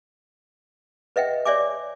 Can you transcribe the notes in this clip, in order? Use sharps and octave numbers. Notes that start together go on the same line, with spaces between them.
B4 D#5 E5 F#5 G5
C#5 D5 E5 G#5 D6